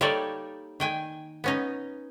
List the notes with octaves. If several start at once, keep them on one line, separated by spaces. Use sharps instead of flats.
G3 A#3 D#4 A4 C#5 D5
D#3 G5 G#5
B3 C#4 D#4